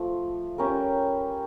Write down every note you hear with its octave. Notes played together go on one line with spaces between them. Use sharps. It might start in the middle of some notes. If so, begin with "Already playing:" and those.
Already playing: F3 A3
G3 C#4 G4 A#4